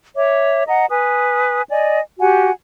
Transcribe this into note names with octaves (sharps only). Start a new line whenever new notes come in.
C#5 E5 D6
D#5 F#5 A#5
B4 G#5 D#6
D5 D#5 G#5
F#4 G4 F#5 G#5